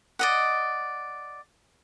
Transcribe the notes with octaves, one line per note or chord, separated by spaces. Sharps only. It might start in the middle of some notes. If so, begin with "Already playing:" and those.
D5 D#5 F#5